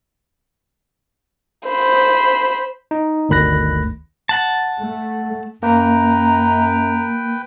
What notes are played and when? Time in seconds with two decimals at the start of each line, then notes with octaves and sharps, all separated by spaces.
1.68 C5 B5
2.91 D#4
3.29 G1 D2 D#3 B5 F#6 A#6
4.29 F#5 A5
4.80 A3
5.63 F#2 A#3 B4 G5 A#5